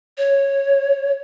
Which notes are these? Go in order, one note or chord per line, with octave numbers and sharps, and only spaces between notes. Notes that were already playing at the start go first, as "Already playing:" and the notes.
C#5